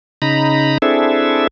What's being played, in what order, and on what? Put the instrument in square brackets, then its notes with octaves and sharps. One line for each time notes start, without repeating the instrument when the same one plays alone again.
[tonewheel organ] C#3 D#4 A#5 B5
C4 D4 E4 G#4 A4 E5